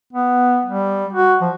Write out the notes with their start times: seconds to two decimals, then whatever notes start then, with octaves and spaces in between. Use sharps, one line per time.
0.13 B3
0.66 G3
1.13 F#4
1.41 F3